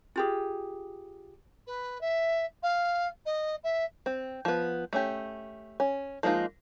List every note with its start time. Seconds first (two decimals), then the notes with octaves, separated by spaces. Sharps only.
0.16 F4 G4 G#4
1.66 B4
2.01 E5
2.63 F5
3.25 D#5
3.63 E5
4.06 C4
4.45 F3 B3
4.93 A3 C#4 G4
5.80 C#4
6.23 F3 G#3 A#3 D#4 F4